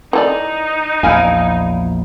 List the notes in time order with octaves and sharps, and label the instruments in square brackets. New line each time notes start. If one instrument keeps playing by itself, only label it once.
[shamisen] E3 A4 D5 [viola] D#4
[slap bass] A#1 E2 [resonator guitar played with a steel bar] E4 F5 G#5